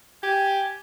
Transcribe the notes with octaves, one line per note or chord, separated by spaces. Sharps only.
G4 G#5